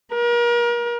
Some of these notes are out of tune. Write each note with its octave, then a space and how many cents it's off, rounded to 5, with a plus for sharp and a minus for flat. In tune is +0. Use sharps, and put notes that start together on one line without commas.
A#4 +35